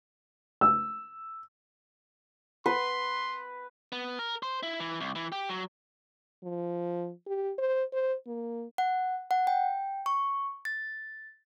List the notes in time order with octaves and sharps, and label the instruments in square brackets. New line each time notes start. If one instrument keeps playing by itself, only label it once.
[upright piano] E6
[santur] B4 [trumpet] C6
[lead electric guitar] B3
A#4
C5
E4
E3
C2
E3
G4
F#3
[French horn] F3
G4
C5
C5
A#3
[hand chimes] F#5
F#5
G5
C#6
A6